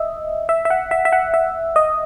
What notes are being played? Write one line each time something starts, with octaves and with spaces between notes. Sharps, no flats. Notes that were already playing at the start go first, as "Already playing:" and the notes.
Already playing: D#5 E5
E5
E5
F#5
E5
E5
F#5
E5
D#5